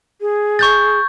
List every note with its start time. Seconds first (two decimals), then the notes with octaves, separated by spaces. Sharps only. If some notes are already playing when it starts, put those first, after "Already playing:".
0.21 G#4
0.59 C#6 G6 A6